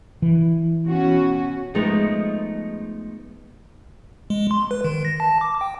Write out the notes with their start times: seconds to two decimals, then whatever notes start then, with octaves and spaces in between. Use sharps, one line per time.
0.22 E3
0.87 B2 C#4 F#4
1.75 F3 G#3 A3 B3 D#4
4.30 G#3
4.51 C6
4.71 B4
4.84 D#3
5.05 A#6
5.20 A5
5.41 D6
5.61 G5